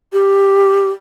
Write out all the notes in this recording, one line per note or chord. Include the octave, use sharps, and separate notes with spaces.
G4